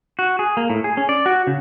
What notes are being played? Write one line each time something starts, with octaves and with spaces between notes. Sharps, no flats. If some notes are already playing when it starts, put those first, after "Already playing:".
F#4
G#4
A#3
A2
G#4
C#4
D5
F#4
C#3